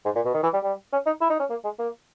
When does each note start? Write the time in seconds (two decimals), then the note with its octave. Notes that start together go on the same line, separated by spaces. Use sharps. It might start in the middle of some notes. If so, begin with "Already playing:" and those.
0.05 G#2
0.15 A#2
0.25 B2
0.34 D#3
0.43 E3
0.53 G3
0.63 G3
0.92 C#4
1.06 D#4
1.21 E4
1.30 D#4
1.39 C#4
1.50 A#3
1.64 G#3
1.79 A#3